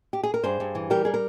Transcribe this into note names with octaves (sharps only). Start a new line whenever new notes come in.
G4
G#4
A#4
G2 G#4 C5
G2
E3
G3 G4 A#4
G3 G#4
A#4